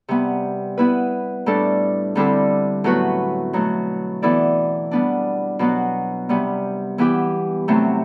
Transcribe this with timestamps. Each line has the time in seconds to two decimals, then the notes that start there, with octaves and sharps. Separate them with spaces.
0.08 C3 G3 B3
0.78 B3 E4 B4
1.46 A2 G3 D4 A4
2.15 D3 G3 C4 E4 A4
2.84 A2 F#3 B3 F#4 B4
3.53 B2 F#3 A3
4.22 E3 B3 E4 A4 D5
4.91 G3 B3 D4
5.59 B2 F#3 B3
6.29 C3 G3 B3
6.98 E3 B3 E4 G4
7.68 C3 F#3 A3 C4 E4